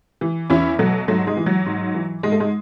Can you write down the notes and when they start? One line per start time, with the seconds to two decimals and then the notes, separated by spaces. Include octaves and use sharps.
0.21 E3
0.50 E2 C#4 E4
0.79 B2 F#3 A3
1.08 G#2 F#3 A3
1.27 G#3
1.37 E3
1.46 F#3
1.66 G#2
1.95 E3
2.23 G#2 G#3
2.32 A3
2.40 G#3